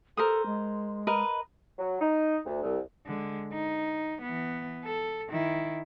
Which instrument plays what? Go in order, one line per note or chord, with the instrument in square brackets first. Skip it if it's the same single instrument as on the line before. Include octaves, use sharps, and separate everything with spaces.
[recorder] A4 [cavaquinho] A#4 C5 D#6
[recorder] G#3
[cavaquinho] A#4 B4 D#5
[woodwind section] F#3
D#4
D2
C2
[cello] D3 G#3
D#4
E3 B3
A4
D#3 E4